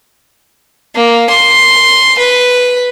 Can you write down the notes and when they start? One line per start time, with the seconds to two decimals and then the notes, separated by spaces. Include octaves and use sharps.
0.95 A#3
1.30 C6
2.18 B4